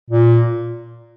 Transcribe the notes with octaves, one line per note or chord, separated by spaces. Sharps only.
A#2